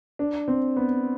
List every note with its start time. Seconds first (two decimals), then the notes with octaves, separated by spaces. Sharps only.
0.19 D4
0.48 C4
0.76 B3